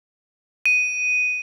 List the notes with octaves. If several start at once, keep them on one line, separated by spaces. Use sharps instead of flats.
D#7